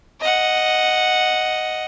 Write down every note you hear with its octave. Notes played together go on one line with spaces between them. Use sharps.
D#5 F#5